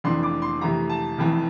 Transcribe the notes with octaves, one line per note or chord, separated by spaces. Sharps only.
F1 F2 E3 A3 D4 C6
D6
C6
F2 C3 E3 A3 A#5
A5
F1 F2 E3